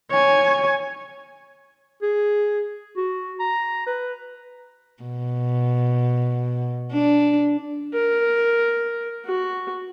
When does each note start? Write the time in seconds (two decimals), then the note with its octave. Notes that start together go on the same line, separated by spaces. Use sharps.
0.11 C#5 G#5
2.02 G#4
2.97 F#4
3.39 A#5
3.86 B4
5.03 B2
6.93 D4
7.93 A#4
9.25 F#4